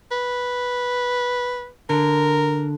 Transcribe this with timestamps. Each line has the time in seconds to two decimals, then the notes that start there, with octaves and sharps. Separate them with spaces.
0.11 B4
1.89 D3 A#4